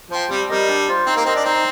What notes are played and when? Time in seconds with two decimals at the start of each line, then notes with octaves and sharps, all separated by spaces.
0.11 F3 C5 G5
0.30 G3 C4
0.49 G3 G4 A#4 D#5
0.68 D4
0.88 F4 C5
1.07 C4 D#4
1.16 A#3
1.25 C4 A#4 D#5
1.36 D4
1.44 C4 D#4